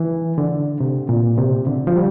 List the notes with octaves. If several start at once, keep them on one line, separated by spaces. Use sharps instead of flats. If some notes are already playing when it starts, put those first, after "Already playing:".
Already playing: E3
D3
C3
A#2
C3
D3
F3
G3